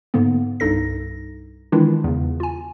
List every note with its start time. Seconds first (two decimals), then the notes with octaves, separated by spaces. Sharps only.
0.14 G#2 D3 A#3 B3
0.60 C2 G2 D#4 A4 A#6
1.72 D#3 E3 G#3 D4 E4 F4
2.04 E2 C#3
2.40 F4 G#5